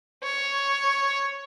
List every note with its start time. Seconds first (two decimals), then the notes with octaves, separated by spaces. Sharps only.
0.23 C#5